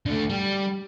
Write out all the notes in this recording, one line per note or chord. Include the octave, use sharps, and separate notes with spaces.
D3 A3
G3